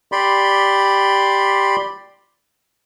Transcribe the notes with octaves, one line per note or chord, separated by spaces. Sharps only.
G4 D5 B5 C6